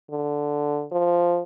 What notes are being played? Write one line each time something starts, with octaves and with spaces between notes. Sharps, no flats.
D3
F3